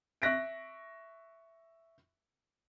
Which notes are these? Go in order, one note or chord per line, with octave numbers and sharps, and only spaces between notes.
E5 C#6 F#6 A#6 B6 D7